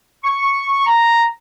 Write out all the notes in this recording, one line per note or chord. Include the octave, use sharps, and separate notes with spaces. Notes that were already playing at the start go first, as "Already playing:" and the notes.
C#6
A#5